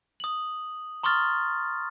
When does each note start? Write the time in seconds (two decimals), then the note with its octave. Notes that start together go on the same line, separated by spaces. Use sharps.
0.20 D#6 F#7
1.03 A#5 C6 C#6 D#6 F6 A6